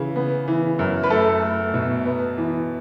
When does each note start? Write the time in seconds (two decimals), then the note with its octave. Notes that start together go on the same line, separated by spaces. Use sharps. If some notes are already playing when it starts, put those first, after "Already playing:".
Already playing: C#3 E3
0.16 B3
0.47 E3
0.79 F#2
1.03 B4
1.10 A3 A4
1.42 A3
1.74 B2
2.06 B3
2.37 E3